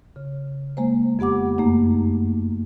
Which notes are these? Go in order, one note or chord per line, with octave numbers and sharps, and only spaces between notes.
C#3
G#3 A#3 C5
F2 B3 G4 F#5 D6
F#2 A3 A#3 D#4